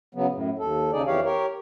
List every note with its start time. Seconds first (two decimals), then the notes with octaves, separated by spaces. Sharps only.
0.15 C#3 F#3 B3
0.32 F#2 A2
0.59 D#2 A4
0.92 D#2 C#3 D#4 G#4 D5
1.07 F2 E3 G4 C#5 F5
1.25 G4 A#4 C#5